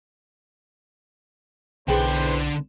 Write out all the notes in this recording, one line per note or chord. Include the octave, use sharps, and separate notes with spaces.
B1 E2 D3 G#4 B4 C5 G5 C6